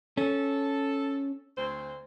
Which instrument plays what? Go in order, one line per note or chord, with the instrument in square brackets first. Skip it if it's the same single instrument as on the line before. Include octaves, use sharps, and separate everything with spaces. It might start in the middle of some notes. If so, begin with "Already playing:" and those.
[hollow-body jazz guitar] C#4 [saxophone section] A4
[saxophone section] D2 C4 C5